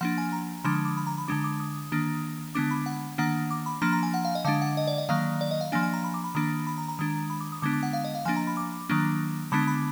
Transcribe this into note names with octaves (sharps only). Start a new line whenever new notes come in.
F3 A#3 D4 F#5
G#5
A#5
D3 F3 G#3 D4 B5
D#6
D6
B5
A#5
B5
D3 G#3 D4 D6
D6
D#6
D#3 A#3 D4
D3 G#3 B3 D4 D6
B5
F#5
D#3 A#3 D4 F#5
D6
B5
F3 A#3 D4 A#5
A#5
G#5
F#5
F5
D#5
D3 G#3 D4 F5
F#5
D#5
D5
D#5
D#3 F#3 A#3 F5
D5
D#5
F5
F3 A#3 D4 G#5
G#5
A#5
B5
D6
B5
D#3 A#3 D4 B5
B5
A#5
A#5
D#3 G#3 D4
B5
D6
D#6
D3 G#3 B3 D4 D6
D6
F#5
F5
D#5
F5
F3 A#3 D4 G#5
A#5
B5
D6
D#3 F#3 A#3 D4
D3 G#3 B3 D4 B5
D6
B5